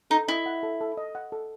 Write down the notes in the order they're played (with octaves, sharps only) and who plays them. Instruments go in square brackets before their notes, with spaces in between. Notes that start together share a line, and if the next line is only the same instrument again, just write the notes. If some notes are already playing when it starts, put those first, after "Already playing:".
[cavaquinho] D#4 [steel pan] A4
[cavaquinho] E4 [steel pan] D#5
[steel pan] F#5
A4
A4
D#5
F#5
A4